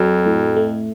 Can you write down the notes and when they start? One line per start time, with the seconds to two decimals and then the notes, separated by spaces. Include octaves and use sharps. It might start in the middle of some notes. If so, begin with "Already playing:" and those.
Already playing: F2 F#3
0.26 A2
0.56 A3